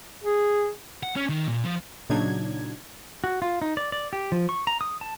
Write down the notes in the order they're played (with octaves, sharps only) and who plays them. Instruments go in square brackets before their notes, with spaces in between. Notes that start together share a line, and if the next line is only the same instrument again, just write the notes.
[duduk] G#4
[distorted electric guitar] F#5
C#4
D#3
A#2
F3
[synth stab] A#2 C#3 F#3 D4 D#4 G#6
[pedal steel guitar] F#4
F4
D#4
D5
D5
G4
F3
C#6
A#5
D#6
A5